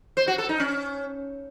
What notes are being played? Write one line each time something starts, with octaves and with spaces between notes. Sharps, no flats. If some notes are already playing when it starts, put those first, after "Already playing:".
C5
F#4
A4
D#4
C#4